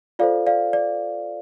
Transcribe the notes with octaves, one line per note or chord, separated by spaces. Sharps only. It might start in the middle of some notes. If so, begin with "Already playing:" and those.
F4 A4 C5 D5 F5
D5 F5
D5